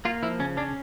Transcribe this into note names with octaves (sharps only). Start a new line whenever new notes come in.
A#3 F4
F3 E4
C#3 C#4
C#4 D4